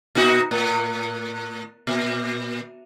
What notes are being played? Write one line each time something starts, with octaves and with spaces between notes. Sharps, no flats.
A#2 D#4 F#4
A2
A#2